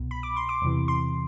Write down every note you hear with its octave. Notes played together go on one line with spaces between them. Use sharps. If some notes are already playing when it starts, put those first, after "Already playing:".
Already playing: C2 B2
B5
D6
C6
D6
E2 C3 E3
C6